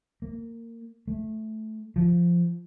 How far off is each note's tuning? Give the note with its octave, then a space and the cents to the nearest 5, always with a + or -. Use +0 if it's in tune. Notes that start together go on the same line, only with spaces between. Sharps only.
A#3 -20
A3 -10
F3 -10